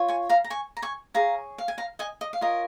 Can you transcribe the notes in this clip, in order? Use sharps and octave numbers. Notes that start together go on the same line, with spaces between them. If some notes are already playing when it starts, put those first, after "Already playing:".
Already playing: F4 C#5
G#5 C#6
F5 A#5
A#5
G#5 C#6
A#5
G#5 C#6
G#4 C#5 F5 A#5
F5
G#5
F5 A#5
D#5 G#5
D#5
F5
F4 A#4 C#5 D#5